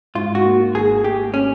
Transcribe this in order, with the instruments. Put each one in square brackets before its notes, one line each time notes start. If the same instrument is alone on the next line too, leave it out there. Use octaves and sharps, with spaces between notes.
[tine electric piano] G#2 [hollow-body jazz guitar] F4
[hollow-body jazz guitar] F#4
[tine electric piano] A#3
[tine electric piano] G#1 [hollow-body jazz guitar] G#4
[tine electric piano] A3 [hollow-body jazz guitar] G4
[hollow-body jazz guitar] C#4